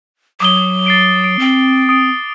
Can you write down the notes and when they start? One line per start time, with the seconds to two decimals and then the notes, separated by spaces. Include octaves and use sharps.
0.40 F#3 D6 D#6 G7
0.86 A6 C7 D7
1.24 D7
1.39 C4
1.89 D#6 D7